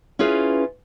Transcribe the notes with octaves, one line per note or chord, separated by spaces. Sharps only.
C#4 E4 F4 G#4 B4